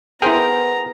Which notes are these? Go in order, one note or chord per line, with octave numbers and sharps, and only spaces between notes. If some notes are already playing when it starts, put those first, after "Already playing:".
B3 E4 G#4 A#4 C5 G5 A#5